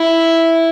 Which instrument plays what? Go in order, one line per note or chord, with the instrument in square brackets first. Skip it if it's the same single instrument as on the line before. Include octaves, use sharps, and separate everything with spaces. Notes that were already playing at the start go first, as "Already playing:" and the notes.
Already playing: [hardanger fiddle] E4